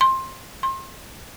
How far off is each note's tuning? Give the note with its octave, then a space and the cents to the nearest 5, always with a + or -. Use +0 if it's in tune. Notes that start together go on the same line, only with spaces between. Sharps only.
C6 +15
C6 +30